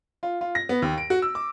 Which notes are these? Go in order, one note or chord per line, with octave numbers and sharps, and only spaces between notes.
F4
F4
A#6
B3
D#2
D7
F#4
E6
D6